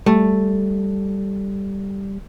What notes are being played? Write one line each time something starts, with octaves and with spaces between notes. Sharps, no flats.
G3 A3